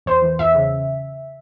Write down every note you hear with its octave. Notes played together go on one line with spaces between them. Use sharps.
E2 C5
E3
E2 E5
C#3